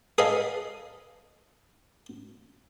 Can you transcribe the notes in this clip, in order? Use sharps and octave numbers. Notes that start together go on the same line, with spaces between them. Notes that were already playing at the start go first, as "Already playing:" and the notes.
G#4 A4 B4 D#5 F5